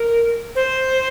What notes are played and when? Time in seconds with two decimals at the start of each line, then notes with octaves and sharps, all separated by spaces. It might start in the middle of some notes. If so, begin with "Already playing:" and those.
Already playing: A#4
0.56 C5